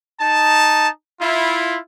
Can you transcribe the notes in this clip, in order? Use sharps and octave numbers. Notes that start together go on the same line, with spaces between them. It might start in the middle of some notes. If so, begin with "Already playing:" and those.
D#4 A5
E4 F4